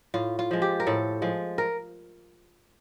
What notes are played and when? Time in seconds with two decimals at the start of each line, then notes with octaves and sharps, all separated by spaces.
0.14 A2 F4
0.39 F4
0.51 F3 G#3
0.62 G4
0.80 A#4
0.87 A2 A4
1.22 F3 G#3
1.58 A#4